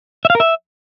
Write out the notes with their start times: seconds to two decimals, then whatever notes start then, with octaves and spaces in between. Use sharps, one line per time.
0.25 E5
0.30 F5
0.35 A#4
0.40 E5